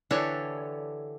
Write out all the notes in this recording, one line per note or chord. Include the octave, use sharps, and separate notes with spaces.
D3 E3 D4 G4 A4 C#5